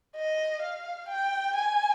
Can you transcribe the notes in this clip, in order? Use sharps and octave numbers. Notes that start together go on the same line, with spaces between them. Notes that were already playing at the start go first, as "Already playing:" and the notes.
D#5
F5
G5
G#5